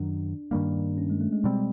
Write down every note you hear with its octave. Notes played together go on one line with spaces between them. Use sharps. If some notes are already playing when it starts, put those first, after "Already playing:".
Already playing: F#2 D#3 F#3 D4
G2 D#3 G3 A#3 D4
C#4
G#3
A3
G#3
B2 G3 C4